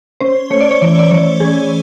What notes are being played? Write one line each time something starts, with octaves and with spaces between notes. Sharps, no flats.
C#4 C5
A3 C#5
D5
C#5
E3 D5
D5
E3 C#5
C#4 G#4